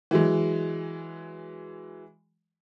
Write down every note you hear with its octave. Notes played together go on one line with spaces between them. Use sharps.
E3 F#3 G#3